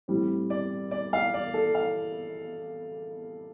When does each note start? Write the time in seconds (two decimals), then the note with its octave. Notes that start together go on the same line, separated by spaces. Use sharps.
0.08 A2 G3 C4
0.50 D5
0.91 D5
1.13 F5
1.34 D5
1.54 A4
1.75 F5